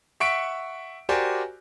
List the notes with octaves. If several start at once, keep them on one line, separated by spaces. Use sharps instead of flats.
E5 F#5 C#6 B6 D7
F#4 G4 A#4 C5 D5 G#5